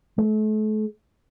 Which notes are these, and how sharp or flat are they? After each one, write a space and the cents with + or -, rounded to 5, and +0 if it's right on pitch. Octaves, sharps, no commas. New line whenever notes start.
A3 -40